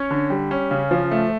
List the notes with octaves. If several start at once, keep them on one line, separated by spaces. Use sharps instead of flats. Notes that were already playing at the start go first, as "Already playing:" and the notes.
Already playing: C#4 C#5
D3
G3
C#4
C#3
F3
A3